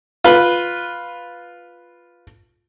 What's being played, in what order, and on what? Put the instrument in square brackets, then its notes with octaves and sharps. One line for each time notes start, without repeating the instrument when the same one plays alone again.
[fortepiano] F4 B4